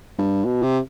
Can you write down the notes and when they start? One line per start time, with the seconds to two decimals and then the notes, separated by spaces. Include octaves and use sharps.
0.18 G2
0.46 B2
0.63 C3